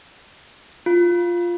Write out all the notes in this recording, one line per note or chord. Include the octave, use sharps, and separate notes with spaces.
F4